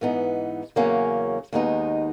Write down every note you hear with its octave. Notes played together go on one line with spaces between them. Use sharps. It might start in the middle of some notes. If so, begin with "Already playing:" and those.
G#2 E3 B3 D#4
E2 C#3 F#3 A#3 C#4
D#2 D#3 G#3 B3 D#4